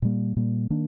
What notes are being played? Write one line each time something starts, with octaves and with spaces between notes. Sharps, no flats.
A#2 G3 A#3
A#2 G3 A#3
D#3 A#3 D4